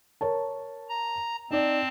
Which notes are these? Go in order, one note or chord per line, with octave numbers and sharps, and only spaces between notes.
A#4 C#5 A5
A#5
C4 D#4 D5 A5